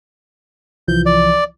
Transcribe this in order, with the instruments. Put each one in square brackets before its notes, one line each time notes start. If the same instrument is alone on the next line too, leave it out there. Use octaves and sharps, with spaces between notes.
[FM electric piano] C2 E3 F3 [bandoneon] G6
[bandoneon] D5